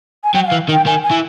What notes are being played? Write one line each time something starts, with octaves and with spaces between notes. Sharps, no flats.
G#5
F#3 G5
F#5
F5
E3
D#3
G5
D#3 G#5
G#5
E3